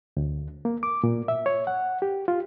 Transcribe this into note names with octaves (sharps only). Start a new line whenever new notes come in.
D2
A#3
D6
A#2
E5
C#5
F#5
G4
F4